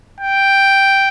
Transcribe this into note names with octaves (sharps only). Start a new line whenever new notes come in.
G5